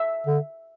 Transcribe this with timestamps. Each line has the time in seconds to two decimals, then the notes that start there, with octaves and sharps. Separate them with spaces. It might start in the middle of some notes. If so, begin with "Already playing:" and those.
Already playing: E5
0.27 D3